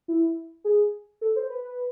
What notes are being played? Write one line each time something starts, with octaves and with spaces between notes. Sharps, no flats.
E4
G#4
A4
C5
B4